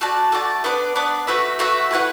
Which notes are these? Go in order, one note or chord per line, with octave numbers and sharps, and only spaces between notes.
A3 F#4 D5 A5
A3 F#4 D5 A5
B3 D4 B4 D5
B3 D4 B4 D5
A3 F#4 B4 E5
A3 F#4 B4 E5
A3 E4 B4 F#5